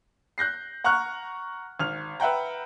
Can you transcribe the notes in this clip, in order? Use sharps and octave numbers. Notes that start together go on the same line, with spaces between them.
F#6 G6 A#6 C7
F#5 A#5 C#6 F6 F#6
G#1 F6 F7
B4 E5 F#5 G5 A#5